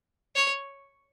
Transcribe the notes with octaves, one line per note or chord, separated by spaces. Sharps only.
C#5